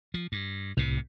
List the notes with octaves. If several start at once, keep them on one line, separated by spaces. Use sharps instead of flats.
F3
G2
C2 A2 C3